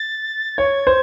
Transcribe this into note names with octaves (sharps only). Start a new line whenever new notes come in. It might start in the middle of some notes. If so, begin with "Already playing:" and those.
Already playing: A6
C#5 G#6
C5